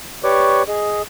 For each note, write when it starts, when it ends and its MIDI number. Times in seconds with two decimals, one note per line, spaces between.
0.24 0.63 67
0.24 0.63 71
0.24 0.63 73
0.24 0.63 74
0.24 0.63 85
0.24 0.63 86
0.68 1.02 68
0.68 1.02 75